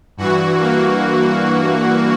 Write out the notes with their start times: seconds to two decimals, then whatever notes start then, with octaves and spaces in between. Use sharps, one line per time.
0.17 G2 E3 F#4
0.58 A#3